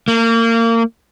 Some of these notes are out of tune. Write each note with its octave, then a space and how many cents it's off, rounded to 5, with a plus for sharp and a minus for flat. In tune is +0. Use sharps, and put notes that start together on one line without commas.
A#3 -30